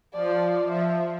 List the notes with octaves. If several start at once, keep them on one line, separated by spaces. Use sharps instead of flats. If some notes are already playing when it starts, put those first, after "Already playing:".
F3 D5
F3 E5